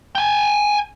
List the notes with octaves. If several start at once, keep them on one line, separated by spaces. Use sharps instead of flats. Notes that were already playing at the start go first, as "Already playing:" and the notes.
G5 G#5